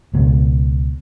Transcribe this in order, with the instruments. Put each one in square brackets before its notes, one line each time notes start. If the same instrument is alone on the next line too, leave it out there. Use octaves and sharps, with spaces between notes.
[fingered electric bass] C#2 B2